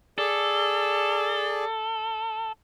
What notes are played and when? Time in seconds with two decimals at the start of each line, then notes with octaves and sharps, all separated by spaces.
0.18 G#4 A4 D5